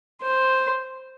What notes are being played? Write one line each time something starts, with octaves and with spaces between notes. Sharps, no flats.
C5